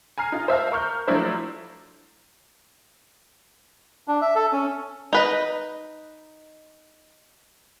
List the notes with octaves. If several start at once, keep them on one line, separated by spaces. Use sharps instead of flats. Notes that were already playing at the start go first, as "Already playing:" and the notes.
G#5 A#5 F6 C7
D#4 F4
C5 E5 F5 A5
A#4 C#6 F6 G6
F3 F#3 A3 D4 E4 C5
D4
E5
A4
C#4
D#4 B4 D#5